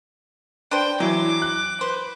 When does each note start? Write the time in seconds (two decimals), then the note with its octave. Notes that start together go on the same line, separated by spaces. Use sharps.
0.71 D4 B4 C5 G5
1.00 E3 F#3 G#4 D6
1.42 F#6
1.81 B4 C5